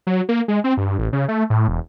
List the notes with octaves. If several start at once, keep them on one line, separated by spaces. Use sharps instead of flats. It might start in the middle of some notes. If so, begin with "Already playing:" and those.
F#3
A#3
G#3
C4
G2
A1
C#3
A3
A2
E1